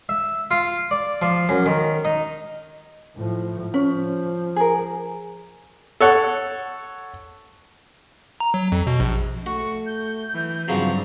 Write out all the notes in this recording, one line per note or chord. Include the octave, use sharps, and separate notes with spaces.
E5
F4
D5
F3
F#2
D#3
D#4
A2 F3
F3 C#4
G#4 A#4
A4 C#5 F#5
A#5
F#3
F2
B2
A#1
A3 F#4 C#6
G6
E3
G2 C#3 F3 F#3 C4 A#5